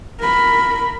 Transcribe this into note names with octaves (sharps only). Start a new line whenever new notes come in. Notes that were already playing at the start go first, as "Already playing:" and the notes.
A#4 B5